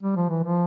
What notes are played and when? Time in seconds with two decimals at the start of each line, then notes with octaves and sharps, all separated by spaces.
0.03 G3
0.16 F3
0.30 E3
0.43 F3